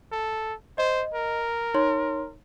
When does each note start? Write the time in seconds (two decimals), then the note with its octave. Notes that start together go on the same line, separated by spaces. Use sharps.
0.12 A4
0.78 C5 D#5
1.14 A#4
1.74 D#4 C#5 C6